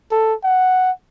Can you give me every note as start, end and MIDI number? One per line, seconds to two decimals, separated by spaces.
0.12 0.34 69
0.44 0.91 78